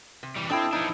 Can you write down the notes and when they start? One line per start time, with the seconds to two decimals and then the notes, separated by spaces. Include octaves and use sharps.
0.23 C3
0.36 E3 G3
0.50 C4 D4 E4 A4 D#5 G5
0.73 F3 B3 D4 D#4